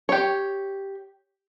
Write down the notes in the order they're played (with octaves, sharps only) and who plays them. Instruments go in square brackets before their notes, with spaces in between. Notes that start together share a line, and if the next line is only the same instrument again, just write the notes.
[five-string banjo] G4 C#5